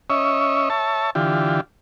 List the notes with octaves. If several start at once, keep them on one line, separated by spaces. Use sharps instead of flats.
C#4 C#5 D#5 E5
C#5 E5 A5
D3 E3 F4 G4